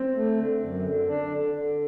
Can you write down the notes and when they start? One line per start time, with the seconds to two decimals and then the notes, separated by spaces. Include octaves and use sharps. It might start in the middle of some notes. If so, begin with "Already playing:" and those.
Already playing: C4
0.15 A3
0.38 D3
0.61 F#2
0.84 D3
1.08 D4
1.32 D3
1.55 D3